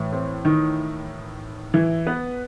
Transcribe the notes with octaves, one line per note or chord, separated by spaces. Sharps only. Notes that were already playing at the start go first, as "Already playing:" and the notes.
Already playing: A2 E3
C4
D#3 D#4
E3 E4
B3 B4